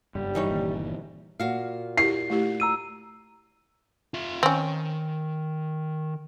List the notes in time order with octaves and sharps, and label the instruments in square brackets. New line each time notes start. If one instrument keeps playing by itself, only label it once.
[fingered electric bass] F#1 G2 [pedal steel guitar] G3
[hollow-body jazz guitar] E3 D#4 C#5
[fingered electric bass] G1 A#2 D#3
[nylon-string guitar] A#2 F#4 F5
[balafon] E4 G4 [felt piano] C7
[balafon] A3 E4 G4
[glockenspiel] A#5 E6 D#7
[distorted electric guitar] F4 E5
[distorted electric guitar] D#3 [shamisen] C4 C#4